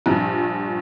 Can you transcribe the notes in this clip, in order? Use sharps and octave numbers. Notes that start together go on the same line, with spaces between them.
A#1 G2 F3